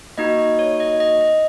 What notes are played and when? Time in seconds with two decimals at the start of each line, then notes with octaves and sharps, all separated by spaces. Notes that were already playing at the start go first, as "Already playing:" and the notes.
0.18 A#3 D#4 F#4 D#5
0.38 D#5
0.59 C#5
0.80 D#5
1.00 D#5
1.21 D#5